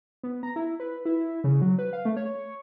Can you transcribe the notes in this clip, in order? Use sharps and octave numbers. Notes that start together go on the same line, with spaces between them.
B3
A#5
E4
B4
E4
C#3
F#3
B4
F5
A3
C#5